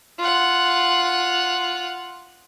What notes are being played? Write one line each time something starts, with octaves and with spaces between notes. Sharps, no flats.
F4 F#5